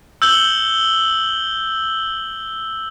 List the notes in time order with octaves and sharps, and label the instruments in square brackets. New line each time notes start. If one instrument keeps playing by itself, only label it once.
[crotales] E6 G6 F#7 G7